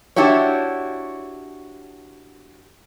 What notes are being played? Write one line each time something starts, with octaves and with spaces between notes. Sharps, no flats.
D4 E4 F#4 G4 C#5